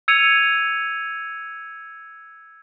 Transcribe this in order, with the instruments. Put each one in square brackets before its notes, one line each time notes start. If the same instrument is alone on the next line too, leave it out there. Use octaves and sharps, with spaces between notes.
[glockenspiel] E6 G#6 C#7 D#7 F7